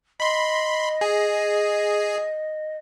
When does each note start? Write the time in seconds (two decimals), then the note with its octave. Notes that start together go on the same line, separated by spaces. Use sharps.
0.20 D#5 B5 C6
1.01 G#4